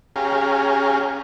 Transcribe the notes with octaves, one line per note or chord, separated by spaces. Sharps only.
C#4 G4 G#4 F5 A#5